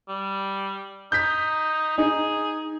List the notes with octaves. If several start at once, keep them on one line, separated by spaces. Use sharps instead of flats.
G3
D#4 G6 B6
D#4 G#4